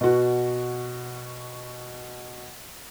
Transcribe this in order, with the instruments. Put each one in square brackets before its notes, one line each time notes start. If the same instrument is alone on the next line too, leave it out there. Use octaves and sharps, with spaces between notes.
[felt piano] B2 F#4